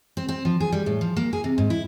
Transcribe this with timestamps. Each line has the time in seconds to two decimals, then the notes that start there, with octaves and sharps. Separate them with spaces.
0.17 C4
0.29 C4
0.45 F3
0.60 G#4
0.72 G3
0.86 A2
1.01 F3
1.17 A#3
1.33 G#4
1.44 C3
1.58 G#2
1.70 E4